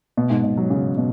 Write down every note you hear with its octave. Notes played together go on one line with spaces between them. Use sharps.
B2
G#2
B2
F#3
C#3
B2